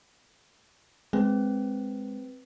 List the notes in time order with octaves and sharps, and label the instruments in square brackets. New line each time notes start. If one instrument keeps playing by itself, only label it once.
[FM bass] G#3 [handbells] C4 B4